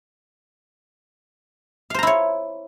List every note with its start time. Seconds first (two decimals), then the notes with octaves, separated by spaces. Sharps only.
1.90 F5
1.94 C5
1.99 A#5
2.03 E4
2.07 C#5